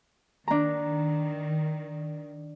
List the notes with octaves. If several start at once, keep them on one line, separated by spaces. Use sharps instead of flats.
D#3 D4 A#5